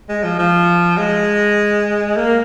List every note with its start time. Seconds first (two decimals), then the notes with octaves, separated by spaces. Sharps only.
0.09 G#3
0.24 F3
0.39 F3
0.98 G#3
2.16 A#3